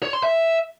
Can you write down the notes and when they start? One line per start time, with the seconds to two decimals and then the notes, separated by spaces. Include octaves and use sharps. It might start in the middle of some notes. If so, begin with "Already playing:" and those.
0.03 C#5
0.13 C6
0.23 E5